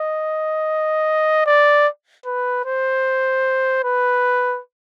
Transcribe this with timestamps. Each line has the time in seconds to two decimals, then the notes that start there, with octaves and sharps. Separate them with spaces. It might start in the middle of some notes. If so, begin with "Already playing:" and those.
Already playing: D#5
1.46 D5
2.26 B4
2.65 C5
3.84 B4